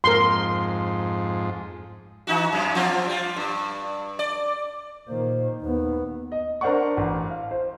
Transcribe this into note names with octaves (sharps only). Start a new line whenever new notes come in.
F2 G#2 A#4 C6
E3 D#4 F#4
F#2 C3
F3 C4 F4
G3 F4
G2
D5
A#2 D#3 A#3 C5
D#2 B3 D#4
D#5
D4 A#4 C5 D5 F#5 C#6
A1
F5
C5